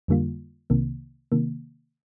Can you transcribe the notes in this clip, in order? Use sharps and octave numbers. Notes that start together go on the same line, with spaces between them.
F2 D3 G3 A#3 F4
C2 C3 D#3 A#3
C3 D#3 A#3